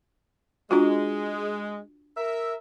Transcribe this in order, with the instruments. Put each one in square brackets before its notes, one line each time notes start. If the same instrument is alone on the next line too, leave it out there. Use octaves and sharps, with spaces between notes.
[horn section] G#3 [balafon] D4 F4 F#4
[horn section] A#4 E5